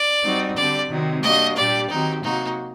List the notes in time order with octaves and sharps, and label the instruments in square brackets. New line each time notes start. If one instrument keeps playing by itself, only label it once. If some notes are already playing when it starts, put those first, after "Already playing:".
Already playing: [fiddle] D5
[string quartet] G3 C4 D#4 F#4
[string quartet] D3 G3 C4 [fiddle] D5
[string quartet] C3 D#3 F#3 C4 D#4
[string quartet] G3 A#3 D4 F#4 [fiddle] D#5
[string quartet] A#2 G3 D4 G4 [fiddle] D5
[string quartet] D#3 F#3 C4 G4 [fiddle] D#4
[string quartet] C3 F#3 A#3 F#4 [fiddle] D#4